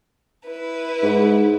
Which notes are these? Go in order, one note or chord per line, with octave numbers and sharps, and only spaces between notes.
E4 B4
G#2